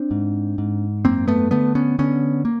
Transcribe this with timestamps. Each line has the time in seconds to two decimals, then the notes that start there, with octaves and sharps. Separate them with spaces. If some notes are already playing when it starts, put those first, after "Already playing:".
Already playing: C4 D4
0.11 G#2
0.58 G#2
1.05 F#2 A#3 C4
1.28 A3 B3
1.51 D3 A3 B3
1.75 B3 C#4
1.99 D3 B3 C#4
2.45 A#3